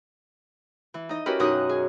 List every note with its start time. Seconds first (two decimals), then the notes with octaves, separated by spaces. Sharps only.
0.94 E3
1.09 D#4 D#5
1.26 C#4 E4 F#4 G4 A#4 B4
1.39 F#2 B2 D#4 D#5 D#6 F#6
1.69 G#4